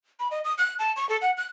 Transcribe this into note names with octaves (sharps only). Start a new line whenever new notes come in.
B5
D#5
D#6
F#6
A5
C#6
A4
F#5
F#6